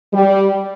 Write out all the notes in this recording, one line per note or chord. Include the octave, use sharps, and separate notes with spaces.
G3